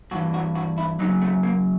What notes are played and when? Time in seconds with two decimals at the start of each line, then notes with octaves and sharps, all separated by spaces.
0.11 G2 F#4
0.14 E3
0.34 F#4
0.55 F#4
0.78 E4
0.99 F#2 C#3 F#3 D#4
1.22 A3
1.43 A#3